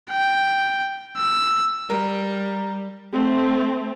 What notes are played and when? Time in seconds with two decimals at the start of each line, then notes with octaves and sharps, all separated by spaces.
0.11 G5
1.17 E6
1.90 G3 A#4
3.12 A3 C4